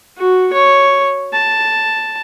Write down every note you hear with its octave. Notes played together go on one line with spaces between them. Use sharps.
F#4
C#5
A5